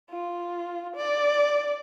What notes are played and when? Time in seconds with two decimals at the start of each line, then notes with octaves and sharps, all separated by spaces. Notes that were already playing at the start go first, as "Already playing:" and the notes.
0.10 F4
0.96 D5